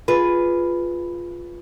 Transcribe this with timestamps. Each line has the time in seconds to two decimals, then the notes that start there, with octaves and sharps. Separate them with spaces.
0.08 F4 G#4 B4